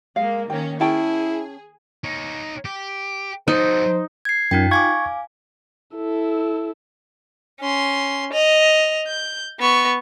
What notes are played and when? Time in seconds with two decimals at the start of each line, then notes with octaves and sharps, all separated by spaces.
0.16 G#3 A#3 F5
0.50 D#3 A#3 C#4 G5
0.81 C#4 E4 G#4 G5 A5
2.04 D#4 C#5
2.65 G4
3.48 F#3 D#4 A4 C5
4.25 G#6 C7
4.51 F#2 D#4 F4 G5
4.71 F5 G#5 C#6 D6 G#6
5.96 E4 A4
7.60 C#4 C6
8.33 D#5 F7
9.08 G6
9.60 B3 C#6